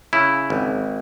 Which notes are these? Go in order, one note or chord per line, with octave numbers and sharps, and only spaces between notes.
C#3 E4
G#1